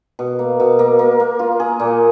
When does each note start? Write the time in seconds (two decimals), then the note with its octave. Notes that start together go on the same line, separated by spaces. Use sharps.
0.19 B2
0.39 A#3
0.60 B2
0.79 A#3
0.99 A#3
1.20 A#3
1.39 F4
1.60 G#4
1.80 A#2